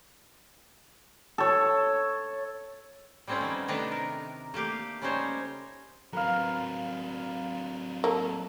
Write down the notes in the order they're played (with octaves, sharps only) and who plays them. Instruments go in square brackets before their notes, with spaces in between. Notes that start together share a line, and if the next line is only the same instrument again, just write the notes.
[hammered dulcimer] A4 C#5
[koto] G3 A3 C4 C#4 E4 F4
D#3 G3 A3 B3
C3 D#3 A3 D4 B4 A#5
A#4
A3 A#3 G4 F5
C#3 G3 C#4 D#4 C5 C#5
[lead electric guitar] F#3 C4 [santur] A#4 B4 F5
[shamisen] A#3 A4